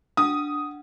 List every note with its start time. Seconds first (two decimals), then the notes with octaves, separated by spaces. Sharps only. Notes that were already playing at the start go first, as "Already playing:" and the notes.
0.17 D4 F#5 D#6